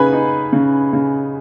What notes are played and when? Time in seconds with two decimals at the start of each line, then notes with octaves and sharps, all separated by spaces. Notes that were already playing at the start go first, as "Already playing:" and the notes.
Already playing: C#3 D#4 G#4 B4 G#5 B5
0.13 D#4
0.53 C#3
0.93 C#3